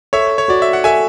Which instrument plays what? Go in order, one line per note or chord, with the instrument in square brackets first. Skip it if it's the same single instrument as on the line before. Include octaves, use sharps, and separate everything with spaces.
[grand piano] A4 [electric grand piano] C#5 E5
[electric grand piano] C#5
[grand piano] F#4 [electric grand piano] D5
[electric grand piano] E5
F#5
[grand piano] A4 [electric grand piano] E5 G#5